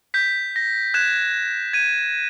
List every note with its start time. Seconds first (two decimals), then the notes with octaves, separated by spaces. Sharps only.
0.14 G6 B6
0.56 A#6
0.94 F#6 G#6 E7
1.73 G#6 D#7